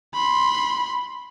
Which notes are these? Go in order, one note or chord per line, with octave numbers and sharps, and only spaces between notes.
B5 C6